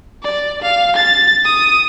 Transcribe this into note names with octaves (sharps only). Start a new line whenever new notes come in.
D5
F5
A6
D#6